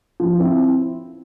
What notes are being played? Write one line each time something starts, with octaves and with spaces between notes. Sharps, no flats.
F3
C4 E4